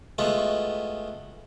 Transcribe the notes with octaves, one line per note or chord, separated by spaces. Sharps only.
G#3 A3 B3 F4 F#4